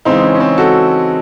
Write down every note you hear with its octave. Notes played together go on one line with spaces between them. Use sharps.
C#3 E3 G#3 C4 D#4
C#4
C#4
C4
F#4 A4